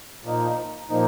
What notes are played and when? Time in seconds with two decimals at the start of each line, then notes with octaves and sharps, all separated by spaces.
0.23 A#2 F3 A#3 D#4
0.90 A#2 F3 A#3 D#4